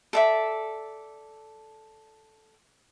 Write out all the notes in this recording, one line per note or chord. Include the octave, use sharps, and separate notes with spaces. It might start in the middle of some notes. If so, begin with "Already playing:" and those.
A4 D5 E5